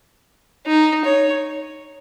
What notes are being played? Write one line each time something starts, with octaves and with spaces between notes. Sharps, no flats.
D#4
C#5